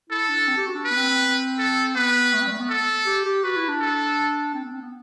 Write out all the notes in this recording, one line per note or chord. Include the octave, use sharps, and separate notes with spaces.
E4 A4
D4
C4
G4
F#4
D4
B4
B3
C4
C4
A4
B3 B4
A3
C4
G3
A3
B3
A4
G4
G4
F#4 B4
E4
D4
A4
C4
B3
C4
B3